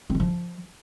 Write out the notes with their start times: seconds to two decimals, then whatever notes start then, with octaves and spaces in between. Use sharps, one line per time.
0.10 C4
0.15 D#3
0.20 F3